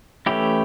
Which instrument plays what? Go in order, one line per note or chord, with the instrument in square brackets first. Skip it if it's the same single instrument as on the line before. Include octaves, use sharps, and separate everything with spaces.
[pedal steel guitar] E3 A3 C#4 E4 G4